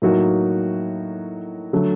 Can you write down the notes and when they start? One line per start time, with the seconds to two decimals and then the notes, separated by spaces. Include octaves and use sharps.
0.02 A2 F#3 A#3 D#4 F#4
1.73 D3 F#3 A3